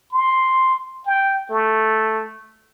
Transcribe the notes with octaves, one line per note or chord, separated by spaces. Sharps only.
C6
G5
A3